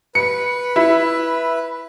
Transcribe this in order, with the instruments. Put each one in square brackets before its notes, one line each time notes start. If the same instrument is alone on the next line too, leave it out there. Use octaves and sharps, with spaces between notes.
[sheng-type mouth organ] B4 [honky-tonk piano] C#7
[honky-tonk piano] E4